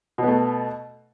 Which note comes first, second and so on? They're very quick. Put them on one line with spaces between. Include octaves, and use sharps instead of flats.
B2 B3 A3